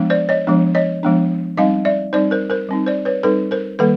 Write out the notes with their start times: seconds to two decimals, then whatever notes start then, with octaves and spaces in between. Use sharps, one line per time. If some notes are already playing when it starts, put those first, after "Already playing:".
Already playing: F3 G#3 B3 D4
0.10 C5 D5
0.29 C#5 D#5
0.47 F3 G#3 B3 D4
0.75 C#5 D#5
1.03 F3 G#3 B3 D4
1.57 G3 C4 D#4 D#5 F5
1.85 D5 E5
2.13 G3 C4 D#4 C5 D5
2.31 A#4 C5
2.50 A#4 C5
2.69 G3 C4 D#4
2.87 C5 D5
3.05 B4 C#5
3.23 G3 C4 D#4 A4 B4
3.51 A#4 C5
3.79 D#3 G3 A#3 A4 B4